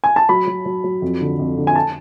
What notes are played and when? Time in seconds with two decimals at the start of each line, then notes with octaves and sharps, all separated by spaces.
0.04 G#5
0.16 A5
0.29 F#3 B5
0.47 F#3
0.66 F#3
0.84 F#3
1.02 F2
1.21 D3
1.39 F2
1.57 D3
1.67 G#5
1.75 A5